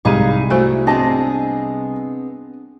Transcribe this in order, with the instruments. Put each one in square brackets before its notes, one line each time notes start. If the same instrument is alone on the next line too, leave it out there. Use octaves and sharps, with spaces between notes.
[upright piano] C2 B5 D#7 [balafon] G#3 [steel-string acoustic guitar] D#4 G#4 F5
[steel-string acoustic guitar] A3 [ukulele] E4 [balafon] F#4 C5 G#5
[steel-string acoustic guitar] B3 C4 G#4 [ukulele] D4 D#5 A5